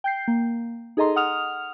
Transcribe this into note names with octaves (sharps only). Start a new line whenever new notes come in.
G5 G6 C7
A#3
D#4 G#4 A4 D#5 A#5 C6
F#5 D#6 F6 F7